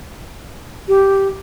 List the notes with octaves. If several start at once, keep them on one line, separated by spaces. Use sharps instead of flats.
G4